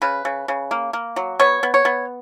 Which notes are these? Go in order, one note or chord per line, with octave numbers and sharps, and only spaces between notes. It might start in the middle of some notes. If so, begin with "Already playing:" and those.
C#3 B4
C#3
C#3
A#3
A#3
F#3
B3 C#5
B3
C#5
B3